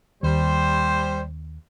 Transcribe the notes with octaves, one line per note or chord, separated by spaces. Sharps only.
D#2 G3 C5